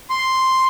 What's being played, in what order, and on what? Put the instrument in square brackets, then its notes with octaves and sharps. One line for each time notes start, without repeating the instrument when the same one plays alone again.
[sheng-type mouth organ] C6